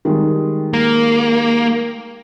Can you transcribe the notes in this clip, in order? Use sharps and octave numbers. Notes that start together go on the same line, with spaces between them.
D#3 G3 G#3
A#3